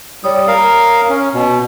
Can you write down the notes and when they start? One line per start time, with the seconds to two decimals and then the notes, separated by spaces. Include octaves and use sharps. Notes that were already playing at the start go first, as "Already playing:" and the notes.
0.24 G3 C#5 D#6
0.48 A#4 F5
1.10 C#4
1.34 B2